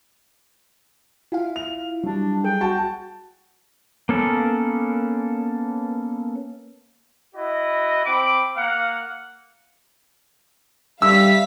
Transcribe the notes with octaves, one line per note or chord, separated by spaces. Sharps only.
E4 F4 F5
F7
F#3 G3 D4
G#4 G5
F#4 A5
A#3 B3 C#4 A4
E4 F#4 D#5
C4 B5 D6
A#3 F5 F#5
G3 E5 F5 E6 B6